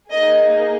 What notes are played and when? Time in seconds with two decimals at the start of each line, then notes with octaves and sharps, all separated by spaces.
0.10 A#3 D#4 G#4 D#5